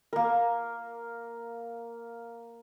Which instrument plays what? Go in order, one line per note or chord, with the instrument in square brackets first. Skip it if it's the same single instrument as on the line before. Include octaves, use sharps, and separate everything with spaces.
[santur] A#3 A#4